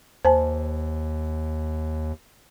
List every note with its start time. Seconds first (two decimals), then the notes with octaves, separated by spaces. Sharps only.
0.25 D#2 C5 G#5 A5